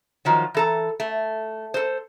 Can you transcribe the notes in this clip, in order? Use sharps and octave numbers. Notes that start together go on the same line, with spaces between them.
D#3 F3 F#3
E3 A4 A#5
A3
A4 C5